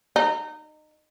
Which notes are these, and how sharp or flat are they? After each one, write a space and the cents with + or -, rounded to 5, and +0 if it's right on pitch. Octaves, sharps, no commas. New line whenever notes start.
D#4 -25